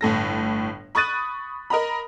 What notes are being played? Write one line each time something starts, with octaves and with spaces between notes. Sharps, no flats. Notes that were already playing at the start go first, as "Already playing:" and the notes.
G1 A2 A4 A#6
B5 C#6 D#6 F#6 A6 D#7
A#4 D#5 A#5 B5